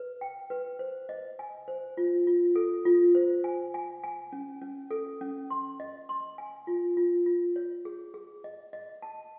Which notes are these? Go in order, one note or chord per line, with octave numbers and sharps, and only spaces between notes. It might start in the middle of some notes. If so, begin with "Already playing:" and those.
Already playing: B4
G5
B4
C5
D#5
G#5
C5
F4
F4
A4
F4
C5
G#5
G#5
G#5
C#4
C#4
A4
C#4
C6
D#5
C6
G#5
F4
F4
F4
C#5
G#4
G#4
D#5
D#5
A5